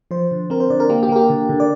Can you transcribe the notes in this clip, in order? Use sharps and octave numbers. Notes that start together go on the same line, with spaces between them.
F3 C5
D3
C4 A#4
C5
D3 D5
A#4
A#3 G4
G4
A#3 A#4
G4
D3
D3
D5